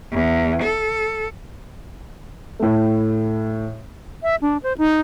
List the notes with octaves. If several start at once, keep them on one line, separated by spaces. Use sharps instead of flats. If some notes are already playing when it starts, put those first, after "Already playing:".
E2
A4
A2 A3
E5
D4
C5
D#4